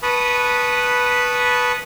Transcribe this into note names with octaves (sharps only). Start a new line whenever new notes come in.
B4 A5 B5 C#6 D#6